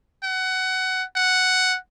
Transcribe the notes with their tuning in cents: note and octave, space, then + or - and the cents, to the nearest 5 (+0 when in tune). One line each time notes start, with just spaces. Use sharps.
F#5 +20
F#5 +5